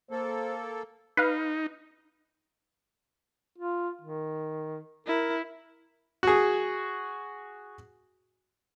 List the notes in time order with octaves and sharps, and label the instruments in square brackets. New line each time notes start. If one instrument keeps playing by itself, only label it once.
[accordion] A#3 A4 [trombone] C5
[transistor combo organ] D#4 [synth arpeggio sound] B4 F5
[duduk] F4
D#3
[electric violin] E4 [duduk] A#4
[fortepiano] F#4 G#4